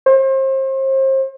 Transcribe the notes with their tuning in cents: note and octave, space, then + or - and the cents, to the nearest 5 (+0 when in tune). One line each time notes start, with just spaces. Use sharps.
C5 +35